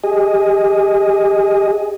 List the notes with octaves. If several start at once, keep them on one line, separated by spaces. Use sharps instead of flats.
G4 G#4 D#5 G#5